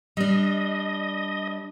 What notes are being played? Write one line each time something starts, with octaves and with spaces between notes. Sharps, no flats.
G3 D4 D#5